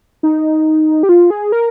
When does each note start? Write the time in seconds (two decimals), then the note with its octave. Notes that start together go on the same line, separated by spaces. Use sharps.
0.23 D#4
1.03 G4
1.09 F4
1.30 G#4
1.52 A#4